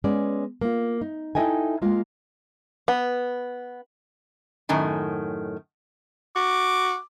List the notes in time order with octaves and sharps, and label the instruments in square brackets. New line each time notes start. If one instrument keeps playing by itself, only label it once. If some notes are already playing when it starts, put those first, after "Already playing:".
[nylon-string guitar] G#3 B3 C#4 D5
A#3 F4
D#4
D#4 E4 A4 D#5 G5 G#5
G#3 A#3 F4
[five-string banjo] B3
[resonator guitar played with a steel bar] F#2 A2 D#3 G#5
[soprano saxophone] F#4 [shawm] D6